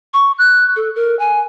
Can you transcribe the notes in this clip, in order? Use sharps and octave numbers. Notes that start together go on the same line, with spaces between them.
C#6
F#6
A4
A#4
G#5